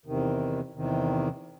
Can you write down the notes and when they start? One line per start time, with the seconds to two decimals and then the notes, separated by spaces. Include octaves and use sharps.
0.06 E2 C3 D#3
0.74 E2 C3 D#3